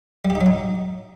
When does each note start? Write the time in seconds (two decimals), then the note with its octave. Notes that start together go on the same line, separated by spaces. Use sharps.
0.25 G3
0.30 G4
0.35 D#4
0.41 F#3
0.46 D#4